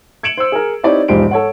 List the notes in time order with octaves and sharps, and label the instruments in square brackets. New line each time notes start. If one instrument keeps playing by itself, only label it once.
[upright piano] G#6 C#7 D7 E7 F#7
C5 E6
G#4 A#4
C4 D#4 E4 G4 C#5 D5
E1 G#2 F3 G4 C5 D7
A4 C#5 F#5